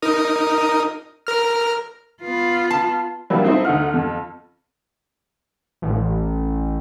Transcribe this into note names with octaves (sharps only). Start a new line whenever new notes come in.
D#4 A#4 D#6
A#4 F6
B3 F4
A5
F#3 G3 A#3 B3 D4 E4
C4 D#4 E4 A4 C5
D2 D#4 F#5 F6
F2
A1